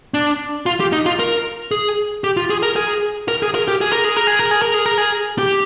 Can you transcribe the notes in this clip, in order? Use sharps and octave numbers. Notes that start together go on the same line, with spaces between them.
D4
F4
G4
D#4
F4
A#4
G#4
G4
F4
G#4
A#4
G#4
A#4
G#4
A#4
G4
G#4
A#4
G#4
A#4
G#4
A#4
G#4
A#4
G#4
A#4
G#4
G4